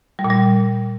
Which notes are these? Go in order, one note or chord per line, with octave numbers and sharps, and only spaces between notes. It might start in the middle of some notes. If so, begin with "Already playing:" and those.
G3
A#2
G3